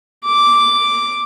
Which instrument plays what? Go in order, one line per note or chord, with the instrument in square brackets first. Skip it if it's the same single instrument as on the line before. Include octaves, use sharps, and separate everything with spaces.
[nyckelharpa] D6